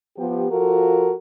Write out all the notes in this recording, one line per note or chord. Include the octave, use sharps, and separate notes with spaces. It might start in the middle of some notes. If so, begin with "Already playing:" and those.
F3 B3 G4
F3 F4 F#4 A4 A#4